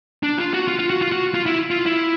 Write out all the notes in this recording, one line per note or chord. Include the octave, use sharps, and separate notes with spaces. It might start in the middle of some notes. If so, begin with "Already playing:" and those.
D4
F4
F#4
F4
F4
F#4
F4
F#4
F4
E4
F4
E4